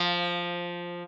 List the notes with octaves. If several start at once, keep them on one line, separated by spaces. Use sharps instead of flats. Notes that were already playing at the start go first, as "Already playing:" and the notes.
Already playing: F3